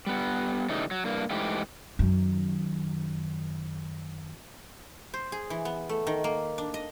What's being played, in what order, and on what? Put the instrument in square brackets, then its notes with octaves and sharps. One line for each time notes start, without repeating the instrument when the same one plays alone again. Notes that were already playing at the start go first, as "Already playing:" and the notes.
[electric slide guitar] G3 B3
C#3 E3 G3 A3 D#4
F#3
G2 A#3
G#2 E3 A3 G4
[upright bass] F#2 D#3
[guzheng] C5
G#4
E3
B3
A3
D#3
A#3
D4
D#5